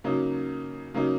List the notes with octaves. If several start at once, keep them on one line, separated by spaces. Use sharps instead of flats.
C#3 F#3 A#3 D#4
C#3 F#3 A#3 D#4